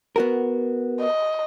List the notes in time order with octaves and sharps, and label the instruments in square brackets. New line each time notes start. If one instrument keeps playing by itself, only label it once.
[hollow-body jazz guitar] B3 F#4 A#4
[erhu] D#5